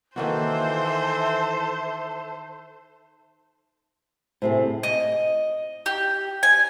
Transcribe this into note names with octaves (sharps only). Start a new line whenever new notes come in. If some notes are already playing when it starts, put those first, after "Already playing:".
D#3 E3 A#3 F#4 A4 C5 E5 A5
A2 C3 G#4 C5
D#5
G4
G#5